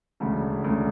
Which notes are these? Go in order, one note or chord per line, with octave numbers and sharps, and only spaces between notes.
E1 D2 C#3
E1 D2 C#3